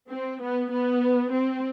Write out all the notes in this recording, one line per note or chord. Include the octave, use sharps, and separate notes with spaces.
C4
B3
B3
C4